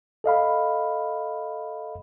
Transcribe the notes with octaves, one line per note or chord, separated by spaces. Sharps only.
A4 D#5 F5 B5